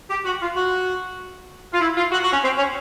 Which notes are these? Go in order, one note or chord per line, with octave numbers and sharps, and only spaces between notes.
G4
F#4
F4
F#4
F4
E4
F4
F#4
F#4
C#4
C4
C#4